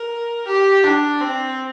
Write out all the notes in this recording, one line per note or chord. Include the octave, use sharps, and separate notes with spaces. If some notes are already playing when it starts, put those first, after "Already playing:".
Already playing: A#4
G4
D4
C4